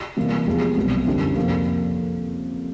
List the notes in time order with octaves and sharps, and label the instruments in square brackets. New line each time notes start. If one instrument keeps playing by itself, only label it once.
[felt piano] C3 E3 G3 A#3
E2 C3 F3 G#3
C2 B2 F#3
F#2 D3 G3 C4 E4
F2 C3 F3 A#3